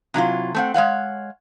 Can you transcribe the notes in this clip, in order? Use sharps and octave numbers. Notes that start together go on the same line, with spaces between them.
C3 F#3 E4 F4
A3 C4 F#5
G#3 C#5 F5 F#5